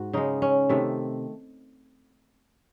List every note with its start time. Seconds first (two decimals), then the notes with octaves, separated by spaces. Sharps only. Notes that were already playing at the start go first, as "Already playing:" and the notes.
Already playing: G#2 F#4
0.13 C#3 G#3 D#4
0.42 C#4
0.69 C3 D#3 A3